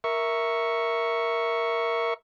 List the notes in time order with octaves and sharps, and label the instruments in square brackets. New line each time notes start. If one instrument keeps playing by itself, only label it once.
[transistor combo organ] A#4 E5 C#6